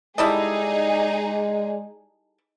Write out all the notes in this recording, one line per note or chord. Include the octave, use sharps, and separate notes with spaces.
G3 G#3 D#4 E4 G#4 A4 D5 D#5